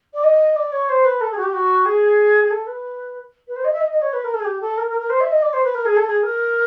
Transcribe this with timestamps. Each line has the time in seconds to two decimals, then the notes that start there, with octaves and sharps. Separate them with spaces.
0.13 D5
0.23 D#5
0.55 D5
0.71 C#5
0.88 C5
1.04 B4
1.20 A4
1.31 G#4
1.37 F#4
1.42 G4
1.52 F#4
1.85 G#4
2.44 G#4
2.50 A4
2.66 B4
3.47 B4
3.56 C5
3.64 D#5
3.72 E5
3.80 D#5
3.90 D#5
4.01 C#5
4.12 B4
4.24 A#4
4.33 A4
4.39 G#4
4.44 G4
4.60 A4
4.77 A#4
4.88 A#4
4.99 A#4
5.09 C5
5.20 E5
5.31 D#5
5.42 D5
5.53 C5
5.63 B4
5.74 A#4
5.85 G#4
5.96 A4
6.07 G#4
6.23 A#4